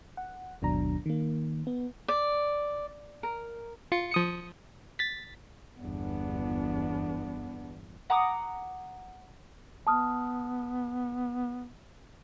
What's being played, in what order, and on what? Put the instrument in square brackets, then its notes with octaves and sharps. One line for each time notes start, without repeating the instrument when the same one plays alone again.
[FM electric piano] F#5
G1 D#2 B2 F#3 D4 A#5
D#3 A#3
B3
[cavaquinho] D5
A#4
[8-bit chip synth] F4 C#7
F3 D#6 C#7
A6 B6
[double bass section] G1 E2 [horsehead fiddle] B3 D4
[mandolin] F#5 A#5 D6 D#6
[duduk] B3 [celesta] A5 D#6 F6